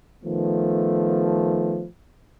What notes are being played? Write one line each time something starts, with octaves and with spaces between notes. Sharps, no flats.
D#3 F3 A3 B3